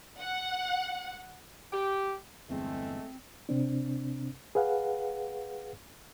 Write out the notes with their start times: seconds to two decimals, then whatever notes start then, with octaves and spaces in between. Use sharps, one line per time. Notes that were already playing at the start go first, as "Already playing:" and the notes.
0.20 F#5
1.72 G4
2.49 G1 E2 G#3 A3 C4
3.49 C3 C4 D4
4.55 G#4 B4 F5 F#5